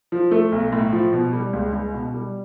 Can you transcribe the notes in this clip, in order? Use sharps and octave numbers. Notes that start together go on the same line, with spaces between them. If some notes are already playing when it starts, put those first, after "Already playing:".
F3
A3
B1
A2
F3
B2
G3
C#2
C#2
B2
G3